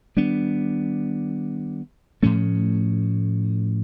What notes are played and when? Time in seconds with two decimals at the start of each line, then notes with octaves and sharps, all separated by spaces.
0.16 D#3 G3 B3 D4
2.23 A2 F3 A3 C#4